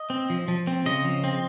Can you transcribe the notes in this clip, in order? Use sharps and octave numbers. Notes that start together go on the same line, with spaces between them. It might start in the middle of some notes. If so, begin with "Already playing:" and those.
Already playing: D#5
C4
F3
F3
C4
C#3 D#5
F3
C4